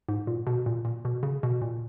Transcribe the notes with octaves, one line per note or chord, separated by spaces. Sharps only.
G#2
A#2
B2
A#2
A#2
B2
C#3
B2
A#2